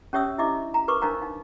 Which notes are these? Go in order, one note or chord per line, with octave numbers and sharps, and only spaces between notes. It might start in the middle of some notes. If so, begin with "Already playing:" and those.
C#4 G4 C#5 E5 D#6 E6
D4 E4 G4 D#5 E5 D6
A#5
A#4 B4 C#6 D6
D4 D#4 A#4 C5 F5 A#5
D#4 F5